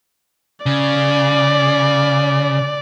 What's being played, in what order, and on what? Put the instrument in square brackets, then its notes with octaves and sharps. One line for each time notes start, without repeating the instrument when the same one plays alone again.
[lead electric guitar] C#3 [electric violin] D5